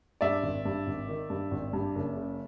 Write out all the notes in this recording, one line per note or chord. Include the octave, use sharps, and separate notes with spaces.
G2 D5 E5
G#1
G2
G#1
D#3
G2
G#1
G2
F#1
C#3